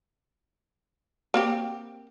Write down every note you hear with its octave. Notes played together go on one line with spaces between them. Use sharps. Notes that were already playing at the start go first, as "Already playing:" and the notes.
A#3 C4 G4